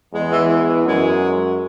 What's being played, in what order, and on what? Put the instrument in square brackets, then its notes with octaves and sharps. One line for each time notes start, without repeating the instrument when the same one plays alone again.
[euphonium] E2 [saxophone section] G#3
[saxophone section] E3
E3
E3
[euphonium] F#2 [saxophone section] G#3